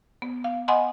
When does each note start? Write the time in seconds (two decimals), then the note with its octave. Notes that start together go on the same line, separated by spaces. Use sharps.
0.22 B3
0.44 F5
0.68 D#5 F#5 G#5 B5 C6